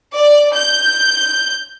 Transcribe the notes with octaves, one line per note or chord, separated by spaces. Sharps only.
D5
G6